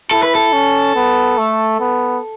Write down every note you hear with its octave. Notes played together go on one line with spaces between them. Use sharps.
E4 A4
B4
A4
C#4
B3
A3
B3